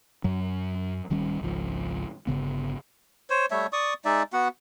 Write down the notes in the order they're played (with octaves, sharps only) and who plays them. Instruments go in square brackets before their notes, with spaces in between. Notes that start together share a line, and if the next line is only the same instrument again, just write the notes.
[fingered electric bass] F#2 F#3
D1 D#3 G3 C#4
G#1 C#2 F3
G1 C#3 B3
[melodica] C5 C#5
G3 A3 C#5 E5
D5 C#6 D#6
G#3 D#4 D5 E5
B3 F#4 F#5